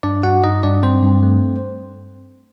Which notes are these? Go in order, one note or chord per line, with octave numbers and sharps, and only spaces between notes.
G2 D4 D5
G2 F#4 F#5
G2 D#4 D#5
G2 D4 D5
G2 C4 C5
G2
A3